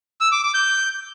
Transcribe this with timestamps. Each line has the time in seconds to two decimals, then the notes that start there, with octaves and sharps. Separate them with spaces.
0.21 E6
0.32 D6
0.43 D6
0.54 G6